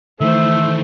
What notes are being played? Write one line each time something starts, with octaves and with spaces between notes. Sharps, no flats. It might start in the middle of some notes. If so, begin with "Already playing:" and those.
D#3 E3 A3 C5 E5